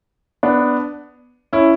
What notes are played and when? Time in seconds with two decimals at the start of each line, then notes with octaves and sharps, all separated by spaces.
0.43 B3 D4
1.53 C#4 E4